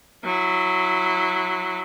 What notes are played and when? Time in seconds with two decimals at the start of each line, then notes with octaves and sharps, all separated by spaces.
0.25 F#3 E4